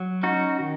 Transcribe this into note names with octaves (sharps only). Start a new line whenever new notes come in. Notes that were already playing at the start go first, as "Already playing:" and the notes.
Already playing: F#3
C#4 D#4 F#4
D#3